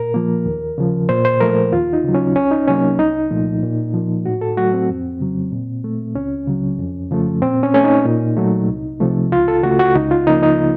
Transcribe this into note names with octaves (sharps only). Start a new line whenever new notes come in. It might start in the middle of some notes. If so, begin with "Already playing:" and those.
Already playing: A#2 A#4
F3 A#3
D#2
C#3 F3
A#2 C5
C5
F3 A3 A#4
D#2 F4
D#4
C#3 F#3
C#4
C2 C#4
D#4
C3 F#3 A#3 C#4
C2 D#4
A#2 F3 A3
A#2
F3 A#3
A2 F#4
A4
F#3 A3 F#4
C4
F2
C#3 F#3
A#2
A3
C#2 C#4
C#3 F#3
F2
C#3 F3 A3
A#2 C4
C#4
A3 C#4
D#4
A#2
F#3 A3
C2
C3 F3 A3
C#2 F4
A4
C#3 A3 F#4
F#4
C#2 D#4
F4
C#3 F3 A#3 D#4
D#4